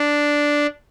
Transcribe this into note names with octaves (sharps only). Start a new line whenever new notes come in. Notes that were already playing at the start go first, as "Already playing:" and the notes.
Already playing: D4